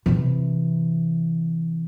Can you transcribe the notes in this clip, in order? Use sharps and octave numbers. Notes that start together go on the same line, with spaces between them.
C3 E3